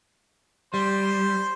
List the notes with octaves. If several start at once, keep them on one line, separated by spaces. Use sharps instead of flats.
G3 C5